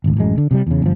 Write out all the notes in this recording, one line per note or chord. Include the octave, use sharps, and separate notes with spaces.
G#1 D2
A1 F#2 G#3
D3
C3 F#3 G3
E2 C#3
G1 F3